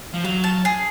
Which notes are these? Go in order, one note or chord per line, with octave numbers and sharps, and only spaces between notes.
F3
F#3 F5
A5
G#4